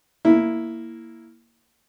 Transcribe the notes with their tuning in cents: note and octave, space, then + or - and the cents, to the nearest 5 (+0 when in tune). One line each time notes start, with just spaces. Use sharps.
A#3 +0 E4 +0